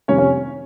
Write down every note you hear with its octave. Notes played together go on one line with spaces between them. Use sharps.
F2 C3 D#3 G3 A#3 C#4 C#5
C#4 C#5